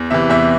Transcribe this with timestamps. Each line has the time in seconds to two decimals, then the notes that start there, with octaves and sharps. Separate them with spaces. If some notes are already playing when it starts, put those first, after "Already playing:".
Already playing: E2
0.10 C3 E3 E5
0.30 E2 E5